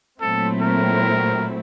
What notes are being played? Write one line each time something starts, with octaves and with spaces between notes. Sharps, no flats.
A#2 F#3 A3 C4 E4 A4
A#4